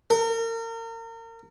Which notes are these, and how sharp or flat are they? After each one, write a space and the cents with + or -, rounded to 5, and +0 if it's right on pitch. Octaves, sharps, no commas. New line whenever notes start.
A#4 -35